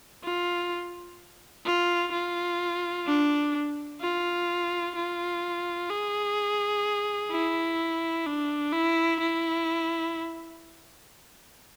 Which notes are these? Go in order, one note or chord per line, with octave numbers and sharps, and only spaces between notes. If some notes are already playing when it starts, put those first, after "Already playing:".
F4
F4
F4
D4
F4
F4
G#4
E4
D4
E4
E4